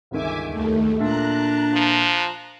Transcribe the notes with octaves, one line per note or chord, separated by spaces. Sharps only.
G1 C#2 D#3 E5 G#5 D6
D#2 A3
A#2 D4 A4 E5 A#5 F#6
F3